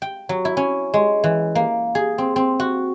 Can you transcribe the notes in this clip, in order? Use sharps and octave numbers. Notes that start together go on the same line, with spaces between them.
G5
F#3
E4
C#4
G#3
E3
A#3
G#4
C4
C4
F#4